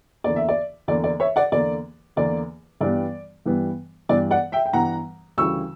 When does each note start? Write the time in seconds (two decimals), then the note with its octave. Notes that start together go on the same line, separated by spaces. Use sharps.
0.24 E2 D3 A#3 D5
0.36 E5
0.49 D5
0.88 E2 D3 A#3 D5
1.04 D5
1.20 C#5 E5
1.36 D5 F#5
1.52 E2 D3 A#3 D5
2.16 E2 D3 A#3 D5
2.81 G2 E3 G3 B3 D5
3.46 G2 E3 G3 B3
4.09 G2 E3 G3 B3 D5
4.31 D5 F#5
4.52 E5 G5
4.66 G5
4.73 G2 E3 G3 B3 F#5 A#5
5.38 D2 C#3 E3 G3 C#6 E6